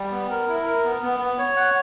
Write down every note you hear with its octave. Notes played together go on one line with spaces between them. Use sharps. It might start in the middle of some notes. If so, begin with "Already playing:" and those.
Already playing: G3
B3
A#4
E4
A#4
B3
B3
B3
C#5
F#5